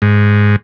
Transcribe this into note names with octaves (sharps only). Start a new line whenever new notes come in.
G#2